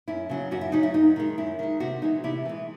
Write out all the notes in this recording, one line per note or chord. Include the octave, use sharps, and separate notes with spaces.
F#2 E4
C#3 F#3 C#4
F#2 F#4
E4
C#3 F#3 C#4 D#4
E4
F#2 D#4
D#3 G#3
F#2 E4
D#3 G#3
C3 F#4
E3 G#3 D#4
C3 E4
E3 G#3